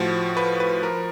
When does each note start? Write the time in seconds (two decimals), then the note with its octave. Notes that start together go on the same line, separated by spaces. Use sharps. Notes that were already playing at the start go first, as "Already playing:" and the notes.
Already playing: A2 F3 F#4
0.37 B4
0.60 B4
0.83 F3 A#4